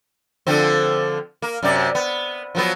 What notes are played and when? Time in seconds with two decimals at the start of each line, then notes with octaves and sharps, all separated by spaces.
0.47 D3 F3 C4
1.42 A#3
1.63 F#2 C3 D5
1.95 B3
2.55 F3 F#3 B3